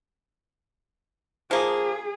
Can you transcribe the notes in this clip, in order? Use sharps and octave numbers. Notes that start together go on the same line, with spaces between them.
F3 A#3 G#4